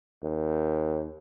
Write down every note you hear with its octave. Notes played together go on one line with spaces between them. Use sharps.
D#2